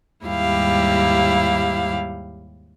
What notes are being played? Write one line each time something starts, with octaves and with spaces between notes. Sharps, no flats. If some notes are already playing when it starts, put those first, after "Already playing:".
D#2 G#2 G3 E4 G4 F5